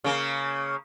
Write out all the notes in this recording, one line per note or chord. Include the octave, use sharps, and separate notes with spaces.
C#3 A#3